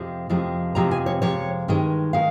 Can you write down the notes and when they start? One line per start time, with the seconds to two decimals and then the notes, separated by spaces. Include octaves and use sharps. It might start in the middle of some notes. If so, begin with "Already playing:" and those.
Already playing: F2 C3 F3 G#3
0.30 F2 C3 F3 G#3
0.75 F2 C3 F3 G#3 A#5
0.91 G#5
1.06 C#5
1.22 F2 C3 F3 G#3 C#5
1.68 G2 D#3 G#3
2.13 D#3 G#3 F5